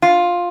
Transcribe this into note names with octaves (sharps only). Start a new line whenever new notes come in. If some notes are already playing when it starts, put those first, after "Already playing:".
F4